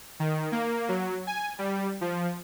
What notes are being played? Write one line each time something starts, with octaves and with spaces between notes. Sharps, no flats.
D#3
A#3
F#3
G#5
G3
F3